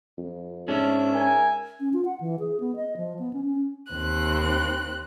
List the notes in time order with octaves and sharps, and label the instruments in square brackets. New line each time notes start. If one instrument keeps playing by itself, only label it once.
[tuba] F2
[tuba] G#2 [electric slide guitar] C#4 D4 [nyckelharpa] E5
[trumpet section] A#4 G#5
[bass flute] C#4
F4
F#5
E3
G#4
B3
D#5
F3
B3
C#4
C#4
[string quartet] D#2 C4 F#6